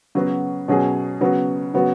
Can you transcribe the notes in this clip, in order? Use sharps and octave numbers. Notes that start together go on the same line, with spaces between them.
C#3 F#3 B3 F#4
B2 F#3 C#4 G#4
C#3 F#3 B3 F#4
C#3 F#3 B3 F#4